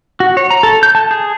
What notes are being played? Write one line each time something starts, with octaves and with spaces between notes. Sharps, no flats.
F#4
C#5
A#5
A4
G6
A5
G#4